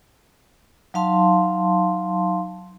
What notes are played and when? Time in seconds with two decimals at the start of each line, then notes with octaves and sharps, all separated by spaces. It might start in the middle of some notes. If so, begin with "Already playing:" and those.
0.94 F#3 D#4 F5 A5 C6